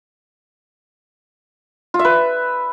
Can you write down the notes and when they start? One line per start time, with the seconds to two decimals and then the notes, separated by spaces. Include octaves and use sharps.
1.94 F4
1.99 E5
2.05 B4